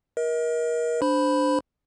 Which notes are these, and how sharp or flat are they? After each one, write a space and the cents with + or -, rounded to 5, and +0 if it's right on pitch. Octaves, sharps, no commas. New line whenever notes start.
A#4 +30 D#5 +40
D4 +0 C5 -10 B5 +0